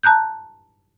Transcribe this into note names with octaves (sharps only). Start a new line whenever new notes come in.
A5 A#5 F#6 G6